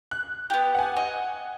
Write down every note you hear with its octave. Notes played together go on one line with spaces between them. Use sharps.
F#6
B3 G4
F#5 G#5
D#5